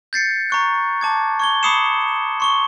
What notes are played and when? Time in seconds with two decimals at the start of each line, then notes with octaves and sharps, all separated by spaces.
0.13 G6 A6 C7 C#7
0.50 A#5 C#6 F#6
1.01 A5 D6 G#6
1.40 C#6 G#6 G7
1.63 B5 D6 D#6 C7 C#7 E7
2.40 C6 C#6 G7